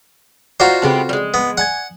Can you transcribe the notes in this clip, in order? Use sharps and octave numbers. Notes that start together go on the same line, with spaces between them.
D#4 F4 F#4 C5 D5 F#5 A#5
C#3 G#3 B3 C4 G4 A4
G3 G#3
B3
D5 F#5 G#5 G#6